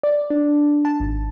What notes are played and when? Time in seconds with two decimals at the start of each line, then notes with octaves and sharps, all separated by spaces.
0.03 D5
0.30 D4
0.85 A5
1.00 G#1